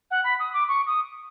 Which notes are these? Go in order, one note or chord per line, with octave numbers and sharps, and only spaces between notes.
F#5
B5
D#6
D6
C#6
D#6